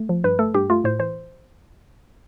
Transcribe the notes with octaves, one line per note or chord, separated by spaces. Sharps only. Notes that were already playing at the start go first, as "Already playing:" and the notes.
Already playing: A3
F3
G2 B4
A3 A4
G2 G4
A3 F4
A2 C5
E3 C5